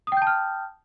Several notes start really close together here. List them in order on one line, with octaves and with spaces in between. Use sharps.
D#6 G5 G6 A5 F6